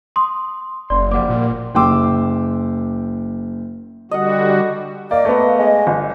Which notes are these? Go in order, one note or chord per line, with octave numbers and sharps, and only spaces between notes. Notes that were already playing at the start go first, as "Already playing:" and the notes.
C6 D#6
F#1 D5 C6
F3 G3 A#3 D5 F#5 D6
A#2
F#1 G5 C6 D6 E6
D3 G3 F#4 D#5 F#5
A#3 D5 D#5
A3 B3
G#3
G1